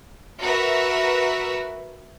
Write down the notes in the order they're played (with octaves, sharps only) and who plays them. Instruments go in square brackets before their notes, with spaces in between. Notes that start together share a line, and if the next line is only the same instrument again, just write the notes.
[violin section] F#4 A#4 B4 E5